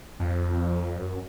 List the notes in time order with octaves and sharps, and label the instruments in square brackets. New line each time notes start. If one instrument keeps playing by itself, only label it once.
[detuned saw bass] F2
F#2